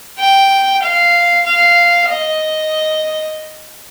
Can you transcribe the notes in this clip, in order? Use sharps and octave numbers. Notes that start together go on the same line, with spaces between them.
G5
F5
F5
D#5